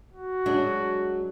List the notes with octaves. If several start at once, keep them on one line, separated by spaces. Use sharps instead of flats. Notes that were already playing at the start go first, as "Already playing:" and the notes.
F#4
F#3 G#3 D4